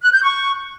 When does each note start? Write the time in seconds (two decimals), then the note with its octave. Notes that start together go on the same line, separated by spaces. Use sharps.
0.02 F#6
0.13 G6
0.23 C#6